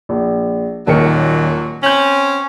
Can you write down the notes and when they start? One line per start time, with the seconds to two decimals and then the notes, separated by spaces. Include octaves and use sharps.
0.09 A#1
0.87 D#1 A#2 D#3 F#3 C#7
1.83 C4 C#4 G6 F#7